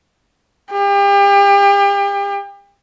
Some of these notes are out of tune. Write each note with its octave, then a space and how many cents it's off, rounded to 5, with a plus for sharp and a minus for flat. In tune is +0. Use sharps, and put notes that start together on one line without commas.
G4 +35